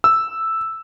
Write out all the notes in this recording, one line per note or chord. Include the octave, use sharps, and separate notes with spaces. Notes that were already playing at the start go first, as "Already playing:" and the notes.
E6